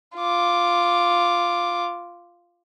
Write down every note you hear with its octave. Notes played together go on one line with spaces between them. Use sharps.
F4 D6